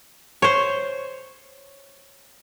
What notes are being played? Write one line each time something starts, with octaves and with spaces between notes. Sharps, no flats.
C5 C#5